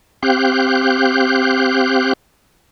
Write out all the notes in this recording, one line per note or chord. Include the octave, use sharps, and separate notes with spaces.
C4 G4 F5 F#6 G6